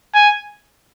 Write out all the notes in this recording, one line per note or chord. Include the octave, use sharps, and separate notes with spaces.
G#5